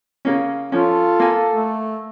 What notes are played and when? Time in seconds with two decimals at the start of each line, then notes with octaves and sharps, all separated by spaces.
0.25 C#3 A#3 C#4
0.72 F3 C#4 F4 A4
1.20 A#3 G#5
1.53 A3